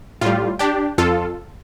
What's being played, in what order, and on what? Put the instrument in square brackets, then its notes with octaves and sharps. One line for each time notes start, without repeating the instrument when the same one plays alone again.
[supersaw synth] A2 G3 F4
D4 G4
F2 F4 A4